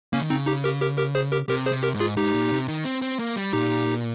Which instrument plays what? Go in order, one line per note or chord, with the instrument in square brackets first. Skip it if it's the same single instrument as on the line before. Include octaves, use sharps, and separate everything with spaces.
[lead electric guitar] C#3 [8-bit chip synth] A#3 C#4
[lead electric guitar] D#3
[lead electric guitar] C#3 [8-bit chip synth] C4 D#4
[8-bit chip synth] D#4 G4
G4 A#4
G4 A#4
G4 A#4
G#4 C5
G4 A#4
[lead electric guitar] C3 [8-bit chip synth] G4 A#4
[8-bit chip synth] G#4 C5
[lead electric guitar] C3
[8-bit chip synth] G4 A#4
[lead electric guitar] G#2
[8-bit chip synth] F4 G#4
[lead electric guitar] G#2 [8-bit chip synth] D#4 G4
[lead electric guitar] A#2
C3
D#3
C4
C4
A#3
G3
[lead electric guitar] A#2 [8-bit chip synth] D#4 G4